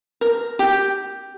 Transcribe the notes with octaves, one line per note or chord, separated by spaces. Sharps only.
A#4
G4